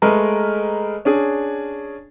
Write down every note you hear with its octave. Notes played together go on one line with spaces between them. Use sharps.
G#3 A3 A#4 B4 D#5
C#4 D4 G#4